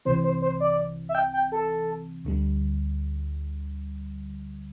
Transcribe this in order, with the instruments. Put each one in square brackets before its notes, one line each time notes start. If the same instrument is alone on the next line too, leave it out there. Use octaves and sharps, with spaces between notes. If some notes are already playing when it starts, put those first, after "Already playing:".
[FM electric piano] C2 C3 E3 C4 [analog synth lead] C5
[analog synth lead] C5
C5
D5
E5
G5
G5
A4
[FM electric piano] D2 D3 G3